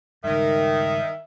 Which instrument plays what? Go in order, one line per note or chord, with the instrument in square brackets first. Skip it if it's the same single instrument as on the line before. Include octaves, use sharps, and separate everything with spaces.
[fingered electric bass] C#2 G2 [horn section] D#3 [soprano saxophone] E5